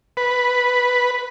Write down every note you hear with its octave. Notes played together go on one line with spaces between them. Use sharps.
B4